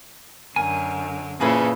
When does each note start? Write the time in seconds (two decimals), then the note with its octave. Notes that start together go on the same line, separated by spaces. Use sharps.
0.56 F#2 D3 A#4 G#5
1.41 A#2 C#3 E3 F3 G#4 A4 B4 B5